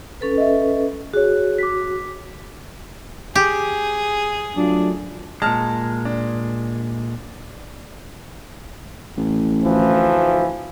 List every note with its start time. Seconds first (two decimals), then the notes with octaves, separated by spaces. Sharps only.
0.21 C#4 A4 B4
0.38 D#5 E5
1.14 F#4 G#4 C#5
1.58 D6 B6
3.35 G4 G#4
4.57 F#3 A3 D4 F4
5.42 A#2 G#3 A5 F6
6.05 D4
9.18 A1
9.63 D2 E3 F3